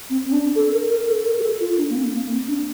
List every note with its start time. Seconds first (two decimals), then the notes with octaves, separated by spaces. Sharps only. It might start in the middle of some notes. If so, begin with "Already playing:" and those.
0.10 C4
0.25 C4
0.32 D4
0.55 A4
0.73 A#4
0.90 A#4
1.08 A4
1.26 A#4
1.39 G4
1.43 A4
1.60 F4
1.78 D4
1.89 A#3
1.95 C4
2.13 A#3
2.31 C4
2.48 D4